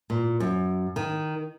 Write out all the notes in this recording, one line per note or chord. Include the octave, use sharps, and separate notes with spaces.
A#2
F#2
D#3